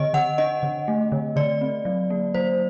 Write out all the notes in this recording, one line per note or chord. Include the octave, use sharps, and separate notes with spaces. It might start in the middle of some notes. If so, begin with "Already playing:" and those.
Already playing: D3 D#5
D3 F#5
D4 D#5
D3
A3
D3
D3 D5
C4
F#3
A#3
F#3 C5